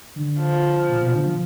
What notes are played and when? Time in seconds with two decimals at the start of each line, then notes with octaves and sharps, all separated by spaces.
0.16 D3
0.39 F3
0.89 A#2
1.01 B2
1.13 D3
1.26 F3